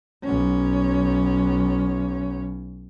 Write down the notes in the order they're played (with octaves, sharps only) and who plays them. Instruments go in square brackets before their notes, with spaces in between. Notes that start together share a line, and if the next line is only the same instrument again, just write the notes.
[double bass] B1 C#4